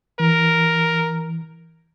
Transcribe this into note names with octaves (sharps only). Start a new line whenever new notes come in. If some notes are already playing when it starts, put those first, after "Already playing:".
E3 A#4